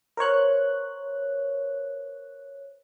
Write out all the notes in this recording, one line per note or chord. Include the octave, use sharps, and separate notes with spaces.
A#4 C5 C#5 F#6